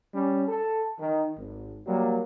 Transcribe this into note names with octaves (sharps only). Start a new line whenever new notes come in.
G3 C#4
A4
D#3
G#1
F#3 G3 A#3